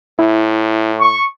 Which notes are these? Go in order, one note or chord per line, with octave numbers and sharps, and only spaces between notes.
A2 E4
C#6